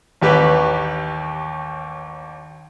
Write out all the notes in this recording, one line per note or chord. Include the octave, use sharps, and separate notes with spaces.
A1 D#2 G4 B4